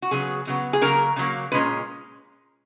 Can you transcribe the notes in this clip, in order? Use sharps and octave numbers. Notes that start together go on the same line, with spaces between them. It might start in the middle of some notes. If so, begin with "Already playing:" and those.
F#4
C#3 F#3 B3 G#4
C#3 F#3 B3
G#4
C#3 F#3 A#3 A#4
C#3 F#3 A#3
A#2 G#3 C#4 B4